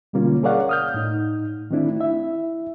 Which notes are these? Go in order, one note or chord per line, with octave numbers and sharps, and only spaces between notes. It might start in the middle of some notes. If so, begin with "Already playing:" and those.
B2 D3 G3 A#3 C#4 F4
G#4 A#4 C#5 D5 F5 F#5
D#6 F6 G6
A2 D#4
D#3 A3 C4 D4 E4
E4 E5